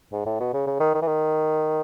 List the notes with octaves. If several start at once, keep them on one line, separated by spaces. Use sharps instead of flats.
G#2
A2
B2
C#3
C#3
D#3
D#3
E3
D#3